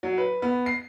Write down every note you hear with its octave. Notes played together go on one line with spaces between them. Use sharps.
F#3
B4
B3
C7